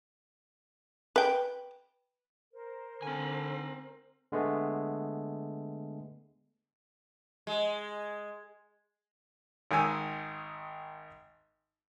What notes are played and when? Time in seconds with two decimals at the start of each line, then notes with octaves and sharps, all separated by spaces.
1.16 B4 G5
2.52 A#4 C5
3.02 D3 C4 G#5
4.32 D3 G#3 A3 B3
7.47 G#3
9.71 G#1 D#3 G#3 G#5 E6